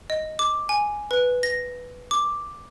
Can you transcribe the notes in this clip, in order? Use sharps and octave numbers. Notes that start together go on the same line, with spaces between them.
D#5
D6
G#5
B4
A#6
D6